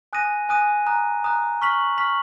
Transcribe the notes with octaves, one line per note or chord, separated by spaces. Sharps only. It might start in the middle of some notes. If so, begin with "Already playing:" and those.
G#5 D#6 F#6 A#6 D#7
G#5 D#6 F#6 A#6 D#7
A#5 D#6 F#6
A#5 D#6 F#6
C#6 F6 B6 F#7
C#6 F6 B6 F#7